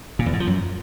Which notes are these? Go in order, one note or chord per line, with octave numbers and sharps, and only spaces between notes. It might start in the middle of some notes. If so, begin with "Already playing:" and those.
A#2
E2
G#2
F3
F#2